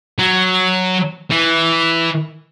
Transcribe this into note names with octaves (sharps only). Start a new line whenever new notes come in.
F#3
E3